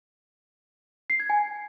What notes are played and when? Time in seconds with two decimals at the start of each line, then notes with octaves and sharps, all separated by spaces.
1.10 C7
1.20 G#6
1.30 G#5